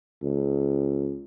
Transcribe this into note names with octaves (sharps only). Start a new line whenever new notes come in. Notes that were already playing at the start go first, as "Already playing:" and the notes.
C#2